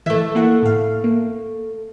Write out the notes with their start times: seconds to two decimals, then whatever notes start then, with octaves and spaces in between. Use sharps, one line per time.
0.06 E3 A3 E5
0.35 A#3 E4 F#5
0.63 A2 F5
1.04 A#3